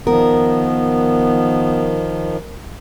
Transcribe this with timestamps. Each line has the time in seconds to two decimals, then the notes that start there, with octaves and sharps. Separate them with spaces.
0.07 D#3 F3 B3 A#4